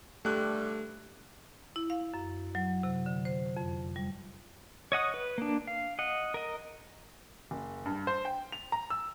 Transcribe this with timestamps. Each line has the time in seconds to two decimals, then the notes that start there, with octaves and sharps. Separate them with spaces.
0.25 G2 D3 G3 A3 F#6
1.76 E4
1.90 F5
2.14 F#2
2.55 F#3
2.83 C3
3.06 D3
3.25 C5
3.57 F2
3.96 G3
4.92 C#5 D#5 F#5 D#6
5.14 B4
5.38 A#3 D4
5.67 F5
5.99 D#5 F#5
6.34 A#4 D#5
7.51 F#1
7.86 G2
8.07 C5
8.25 G5
8.52 F7
8.72 A#5
8.90 E6